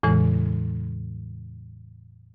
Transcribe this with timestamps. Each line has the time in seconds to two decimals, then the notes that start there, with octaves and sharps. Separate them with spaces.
0.03 E2 A2 C#3 E3 G#3